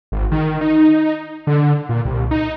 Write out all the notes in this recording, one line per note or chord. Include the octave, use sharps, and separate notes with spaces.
G#1
D#3
D#4
D3
A#2
C2
D#4